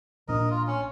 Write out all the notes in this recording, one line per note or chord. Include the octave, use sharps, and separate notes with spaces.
A#1 A#2 D4 A#4 D#5
F4
C#4